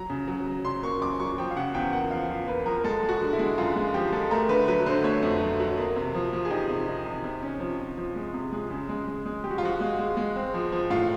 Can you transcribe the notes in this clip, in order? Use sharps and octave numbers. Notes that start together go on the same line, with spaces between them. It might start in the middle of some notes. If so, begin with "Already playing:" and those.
Already playing: F#3 A#5
C#3
F#3
F#3
C#3 C6
A#3 C#6
F#2 D6
F#3 C#6
F3 G5
F5
C#3 F#5
E2 G5
A#3 F#5
F3 F5
F3
A#3 B4
F3 A#4
G#3 A4
G#3
F#4
D3
E4
G#3
F#2 F4
G#3
F3 G4
G#3 A4
A3 A#4
D3 B4
F#3 B4
D3 C5
A3 C#5
F2
F#3
F#3
A#3
C3
F3
F3
G#4
D#4 G4
C3
D#4
C3
C3
C#4
F3
C3
F3
G#3
C3
G#3
C#3
G#3
G#3
G#3
G#3 G4
F#4
F4
F3 F#4
G#3
G#3
G#3
C4
F3
F3
A2 F4